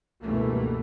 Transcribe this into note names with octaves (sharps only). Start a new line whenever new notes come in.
C#2 G2 B2 E3 A3 A#3